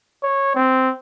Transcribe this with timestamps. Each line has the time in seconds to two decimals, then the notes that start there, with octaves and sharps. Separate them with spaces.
0.23 C#5
0.55 C4